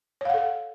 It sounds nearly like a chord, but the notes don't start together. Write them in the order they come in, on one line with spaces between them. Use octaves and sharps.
C#5 F5 F#5 A4